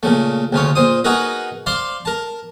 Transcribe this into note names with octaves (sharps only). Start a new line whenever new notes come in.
A#2 C#3 A3
D2 C#3 F4 C#5
A#2 C5 D#6
D#4 F#4 G#4 A#4 B4 D#5
C5 D5 F5 C6
A#4 A5